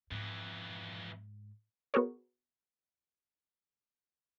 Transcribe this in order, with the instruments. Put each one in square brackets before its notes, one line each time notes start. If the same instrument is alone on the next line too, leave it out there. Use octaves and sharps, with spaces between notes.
[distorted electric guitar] F2 E3 [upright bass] G#2
[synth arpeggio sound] B3 F#4 G#4 A#4 C#5